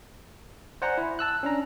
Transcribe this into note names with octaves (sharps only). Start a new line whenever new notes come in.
C5 D5 F#5 G#5 A#5
E4
A5 E6 F#6
C#4 D4 A#5